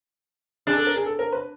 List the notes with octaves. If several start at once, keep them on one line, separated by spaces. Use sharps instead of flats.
D4 G#4
A4
A#4
G#4
A4
A#4
B4